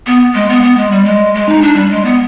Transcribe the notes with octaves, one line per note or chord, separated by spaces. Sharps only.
B3
G#3
B3
B3
G#3
G3
G#3
G#3
D#4
D4
G3
G#3
B3